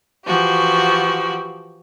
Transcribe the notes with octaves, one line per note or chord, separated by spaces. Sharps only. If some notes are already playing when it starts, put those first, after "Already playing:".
E3 F3 F#4 G4